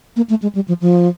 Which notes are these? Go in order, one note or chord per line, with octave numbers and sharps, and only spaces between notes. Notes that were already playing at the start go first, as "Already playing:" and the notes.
A#3
A3
G#3
G3
F3
F3